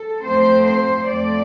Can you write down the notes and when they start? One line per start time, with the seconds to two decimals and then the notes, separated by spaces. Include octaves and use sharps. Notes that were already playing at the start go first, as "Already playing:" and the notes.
Already playing: A4
0.23 F2 F3 A3 C4 C5
0.65 C5
1.06 F2 F3 A3 D5